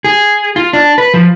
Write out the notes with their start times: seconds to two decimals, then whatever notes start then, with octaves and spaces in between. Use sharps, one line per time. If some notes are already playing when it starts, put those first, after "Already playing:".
0.04 G#4
0.56 F4
0.73 D4
0.98 B4
1.14 F3